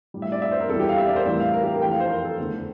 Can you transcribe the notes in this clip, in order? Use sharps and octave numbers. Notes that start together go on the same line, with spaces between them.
A2 G3
E5
D5
E5
C5
A#4
E2 E3 G3 A4
G4
F5
E5
D5
A#4
C5
A2 E3 G3 E5
F5
A#4
G4
A#4
F2 E3 A3 G5
F5
C5
A#4
A4
E2 D3 A3